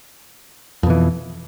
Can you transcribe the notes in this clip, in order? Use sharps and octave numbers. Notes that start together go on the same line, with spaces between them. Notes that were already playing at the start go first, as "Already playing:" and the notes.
F2 B2 E3